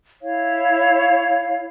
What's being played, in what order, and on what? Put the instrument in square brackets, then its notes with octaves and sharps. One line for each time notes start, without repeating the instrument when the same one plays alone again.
[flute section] E4 C#5 F5